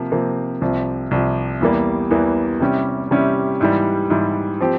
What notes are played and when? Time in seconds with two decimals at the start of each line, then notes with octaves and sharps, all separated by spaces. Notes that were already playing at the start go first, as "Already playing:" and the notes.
Already playing: C3 F3 A#3
0.12 C3 F3 A#3
0.62 C2 C3 F3
1.11 C2 C3 F3
1.61 E2 E3 G3 A#3
2.11 E2 E3 G3 A#3
2.60 C3 G3 C#4 E4 G4
3.11 C3 G3 C#4 E4 G4
3.61 G#2 E3 G3
4.10 G#2 E3 G3
4.60 F3 C4 G4